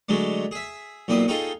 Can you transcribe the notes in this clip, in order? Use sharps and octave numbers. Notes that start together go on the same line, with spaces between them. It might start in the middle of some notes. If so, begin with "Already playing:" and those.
D3 F#3 G#3 A3
G#4 E5
B1 A#2 C4 E4 D#6
D#4 F4 G#4 A4 G5 C#6